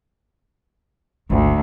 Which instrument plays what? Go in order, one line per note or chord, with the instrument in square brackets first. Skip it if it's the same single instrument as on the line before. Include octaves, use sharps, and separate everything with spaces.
[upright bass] G#1 [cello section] D2